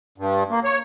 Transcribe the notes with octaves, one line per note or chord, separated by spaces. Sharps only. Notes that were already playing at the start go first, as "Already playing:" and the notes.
G2
A#3
C#5